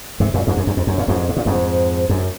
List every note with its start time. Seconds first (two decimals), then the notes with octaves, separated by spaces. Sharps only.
0.20 G#2 C3
0.34 F#2 A#2
0.47 F2 G#2
0.57 F#2
0.67 F#2
0.77 F2
0.87 F#2
0.98 A#2
1.08 F2 G#2
1.29 G#2
1.37 A#2
1.46 F2 G#2
2.09 F#2